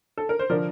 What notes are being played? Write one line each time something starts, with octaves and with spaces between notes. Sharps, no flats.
A4
A#4
C5
D3 F3 A#4 D5